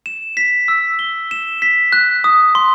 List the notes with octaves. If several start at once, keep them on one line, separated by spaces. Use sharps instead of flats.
E7
B6
E6
G7
E7
B6
F#6
D#6
C6